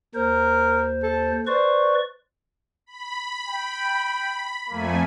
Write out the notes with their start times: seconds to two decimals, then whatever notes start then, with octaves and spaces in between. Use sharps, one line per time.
0.15 D#2 A#4 C5
1.03 A4
1.47 B4 C5 D5 C#6
2.86 B5
3.49 G5
4.70 F2 A3 A#3 G#5